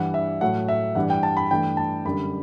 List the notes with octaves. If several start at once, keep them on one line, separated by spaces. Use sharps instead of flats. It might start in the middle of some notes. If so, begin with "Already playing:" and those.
Already playing: G2 E3 G3 F#5
E5
A2 F#3 A3 F#5
E5
G2 E3 G3 F#5
G5
A5
B5
G2 E3 A3 G5
A5
F#2 D3 G3 B5